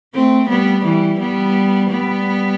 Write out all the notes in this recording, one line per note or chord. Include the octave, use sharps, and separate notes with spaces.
A3 C4
G3 B3
E3 G3
G3 B3
G3 B3